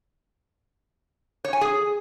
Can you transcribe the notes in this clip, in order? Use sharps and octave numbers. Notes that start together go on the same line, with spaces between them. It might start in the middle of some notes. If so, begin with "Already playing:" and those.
C#5
G#5
G#4